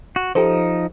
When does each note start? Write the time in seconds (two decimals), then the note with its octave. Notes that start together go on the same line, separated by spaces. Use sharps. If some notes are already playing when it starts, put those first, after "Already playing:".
0.16 F#4
0.35 F3 D#4 G4 A4 C5